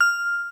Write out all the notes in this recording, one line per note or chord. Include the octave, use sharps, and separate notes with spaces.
F6